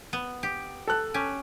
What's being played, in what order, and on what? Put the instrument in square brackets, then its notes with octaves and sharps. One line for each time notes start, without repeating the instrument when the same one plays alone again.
[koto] B3
G4
[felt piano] A4 A5 F#6
[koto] C#4 G4